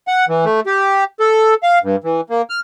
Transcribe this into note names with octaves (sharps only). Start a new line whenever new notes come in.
F#5
E3
A3
G4
A4
F5
G2
E3
A#3
F6